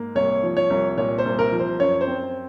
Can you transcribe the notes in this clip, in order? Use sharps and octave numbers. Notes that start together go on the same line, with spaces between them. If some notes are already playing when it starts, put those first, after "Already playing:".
Already playing: G#2 A#3
C2 C#5
F3
C#5
C2
A#2 C#5
C5
C2
A#4
F3
C5
F#2 C#5
C5
C4